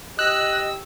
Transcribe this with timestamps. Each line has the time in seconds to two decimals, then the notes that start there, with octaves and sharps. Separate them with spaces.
0.19 G4 D#5 E6 F#6